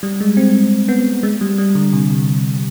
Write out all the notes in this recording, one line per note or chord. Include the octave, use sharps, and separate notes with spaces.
G3
G#3
C4
B3
G#3
G3
G3
D3
C3